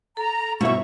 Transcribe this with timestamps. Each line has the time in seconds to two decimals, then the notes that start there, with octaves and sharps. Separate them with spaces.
0.17 A4 A#5
0.61 G1 B2 E4 E5 C#6